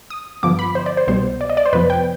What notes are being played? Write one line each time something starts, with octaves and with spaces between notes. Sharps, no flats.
D#6
G2 D3 F3 B3 D6
B5
C5
D5
C5
C2 B2 G3 B3 C5
D5
D#5
D5
C5
F2 C3 F3 B3 B4
G5